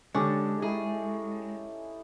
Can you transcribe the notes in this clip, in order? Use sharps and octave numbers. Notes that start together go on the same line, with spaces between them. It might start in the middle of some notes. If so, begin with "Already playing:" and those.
D3 G#3 C#4 G4 A4
D#4 E4 G#4